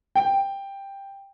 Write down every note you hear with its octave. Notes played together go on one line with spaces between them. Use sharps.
G5